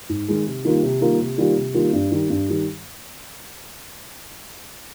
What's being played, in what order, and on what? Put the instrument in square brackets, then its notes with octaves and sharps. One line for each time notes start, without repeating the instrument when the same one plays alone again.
[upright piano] G#2
D#3 G#3 D#4
C3
D#3 G3 A#3 F4
C3
D#3 G3 A#3 F4
C3
D#3 G3 A#3 F4
C3
D#3 G3 A#3 F4
G2
D#3 G3
G2
D#3 G3